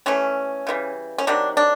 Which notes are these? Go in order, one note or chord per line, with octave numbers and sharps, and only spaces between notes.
E3 A3 C#4
C#3 E3 G3
C#4
C3 D#3 F#3 D4
D4